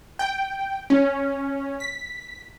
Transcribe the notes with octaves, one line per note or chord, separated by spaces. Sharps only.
G5
C#4
B6